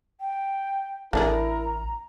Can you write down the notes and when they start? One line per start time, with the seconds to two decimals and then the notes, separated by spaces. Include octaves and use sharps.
0.20 G5
1.13 A1 A3 D4 E4 G#4 A#4 A#5